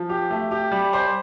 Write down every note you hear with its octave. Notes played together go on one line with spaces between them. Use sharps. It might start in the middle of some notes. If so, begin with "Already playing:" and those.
Already playing: F3
G4
A3
G4
G3
C5